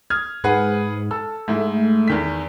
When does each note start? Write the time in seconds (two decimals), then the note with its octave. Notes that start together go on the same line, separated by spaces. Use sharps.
0.10 D#6 F6 G#6
0.44 G#2 G#4 B4 F#5
1.11 A4 E6
1.48 G#2 A3 E4
2.08 E2 D#3 B6